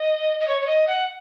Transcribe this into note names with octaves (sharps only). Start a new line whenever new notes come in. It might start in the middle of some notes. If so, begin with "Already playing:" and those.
Already playing: D#5
D#5
C#5
C#5
D#5
F#5